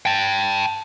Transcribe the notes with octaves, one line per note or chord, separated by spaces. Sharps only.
G5 A5